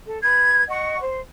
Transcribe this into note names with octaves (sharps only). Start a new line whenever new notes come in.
A4
B4 G#6
D#5 F#5 C#6
C5